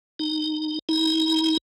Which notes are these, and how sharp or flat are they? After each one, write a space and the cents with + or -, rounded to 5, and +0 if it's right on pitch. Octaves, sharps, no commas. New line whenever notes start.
D#4 -15
D#4 +40